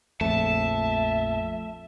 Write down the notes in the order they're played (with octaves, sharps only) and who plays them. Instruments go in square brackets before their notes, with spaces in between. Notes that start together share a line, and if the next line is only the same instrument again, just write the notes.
[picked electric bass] A#1 F2 [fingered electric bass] A3 [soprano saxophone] E5 [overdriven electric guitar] A5